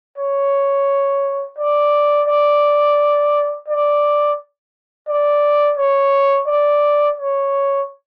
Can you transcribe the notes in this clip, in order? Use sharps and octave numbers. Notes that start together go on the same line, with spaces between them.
C#5
D5
D5
D5
D5
C#5
D5
C#5